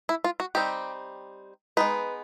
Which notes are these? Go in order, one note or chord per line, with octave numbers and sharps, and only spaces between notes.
E4
F4
F#4
G3 C4 D#4 G4
G#3 B3 D#4 B4